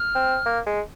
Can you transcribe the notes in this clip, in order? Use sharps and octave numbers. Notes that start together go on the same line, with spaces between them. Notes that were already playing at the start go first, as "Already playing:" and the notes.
Already playing: F6
C4
A#3
G#3